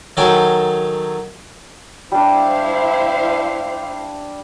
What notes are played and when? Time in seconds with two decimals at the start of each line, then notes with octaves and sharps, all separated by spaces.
0.17 D#3 F#3 A4 G5 G#5
2.12 G3 D4 E4 C5 F5